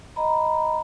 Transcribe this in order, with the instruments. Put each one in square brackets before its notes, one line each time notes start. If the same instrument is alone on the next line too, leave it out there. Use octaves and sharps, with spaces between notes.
[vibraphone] D#5 A#5 B5